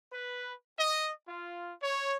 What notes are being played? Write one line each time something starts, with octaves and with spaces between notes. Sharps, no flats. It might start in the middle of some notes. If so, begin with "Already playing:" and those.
B4
D#5
F4
C#5